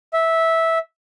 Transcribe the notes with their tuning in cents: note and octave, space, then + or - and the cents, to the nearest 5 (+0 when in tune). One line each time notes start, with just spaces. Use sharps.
E5 -10